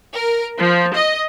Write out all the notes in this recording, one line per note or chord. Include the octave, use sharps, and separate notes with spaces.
A#4
F3
D#5